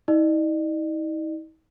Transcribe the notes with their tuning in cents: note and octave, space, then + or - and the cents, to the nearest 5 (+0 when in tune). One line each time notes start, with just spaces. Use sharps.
D#4 +45 D5 +45